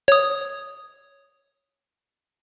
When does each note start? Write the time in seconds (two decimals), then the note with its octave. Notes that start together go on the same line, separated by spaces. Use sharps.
0.08 C#5 D#6